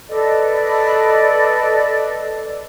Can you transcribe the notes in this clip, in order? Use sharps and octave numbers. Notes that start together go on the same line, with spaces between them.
A4 B4 D5 D#5